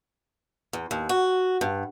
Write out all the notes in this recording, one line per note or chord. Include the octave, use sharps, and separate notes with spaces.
E2
D#2
F#4
G2